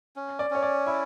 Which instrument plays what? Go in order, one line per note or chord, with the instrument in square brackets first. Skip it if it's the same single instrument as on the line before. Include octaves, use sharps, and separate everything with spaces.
[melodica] C#4
[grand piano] D5
[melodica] C#4 [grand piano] C#5
[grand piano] D5
[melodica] E4 [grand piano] E5